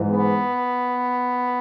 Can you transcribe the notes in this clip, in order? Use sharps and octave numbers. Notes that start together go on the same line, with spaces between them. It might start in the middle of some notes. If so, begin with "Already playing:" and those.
Already playing: G#2 E3
B3